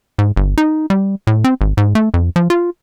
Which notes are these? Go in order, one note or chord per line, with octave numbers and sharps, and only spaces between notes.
G#2
G1
D#4
G3
A2
C4
G#1
G#2
A3
F2
F3
F4